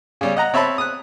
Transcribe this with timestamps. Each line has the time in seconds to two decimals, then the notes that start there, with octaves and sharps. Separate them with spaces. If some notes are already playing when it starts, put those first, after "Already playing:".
0.21 C#3 G3 C#4
0.36 D#5 F#5 A#5
0.54 C4 C#5 E5 A5 B5
0.78 D#6 F#6